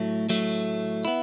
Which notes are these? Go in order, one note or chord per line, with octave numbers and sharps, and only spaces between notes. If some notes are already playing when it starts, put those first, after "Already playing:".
Already playing: A2 F#3 A3
A2 F#3 A3
B3 E4